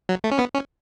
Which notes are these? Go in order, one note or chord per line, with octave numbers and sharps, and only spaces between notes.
F#3
A3
C#4
B3
C#4